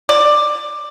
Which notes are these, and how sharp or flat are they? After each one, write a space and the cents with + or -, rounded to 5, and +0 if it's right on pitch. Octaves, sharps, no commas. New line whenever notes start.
D5 +10